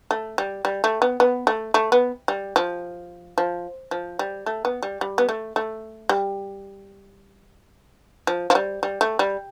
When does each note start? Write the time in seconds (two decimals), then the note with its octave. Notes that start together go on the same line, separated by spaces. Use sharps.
0.11 A3
0.38 G3
0.65 G3
0.84 A3
1.02 B3
1.20 B3
1.47 A3
1.74 A3
1.92 B3
2.28 G3
2.56 F3
3.38 F3
3.91 F3
4.19 G3
4.46 A3
4.65 B3
4.83 G3
5.01 G3
5.18 B3
5.29 A3
5.56 A3
6.09 G3
8.27 F3
8.50 F3
8.55 G3
8.83 G3
9.01 A3
9.19 G3